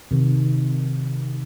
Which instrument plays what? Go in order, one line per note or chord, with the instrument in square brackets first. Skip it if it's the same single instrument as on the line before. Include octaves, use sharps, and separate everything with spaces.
[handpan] C3 D#3